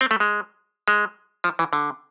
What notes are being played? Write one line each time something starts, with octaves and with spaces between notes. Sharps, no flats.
C4
A3
G#3
G#3
F3
E3
D3